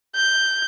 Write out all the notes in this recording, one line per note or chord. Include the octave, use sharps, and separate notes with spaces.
G6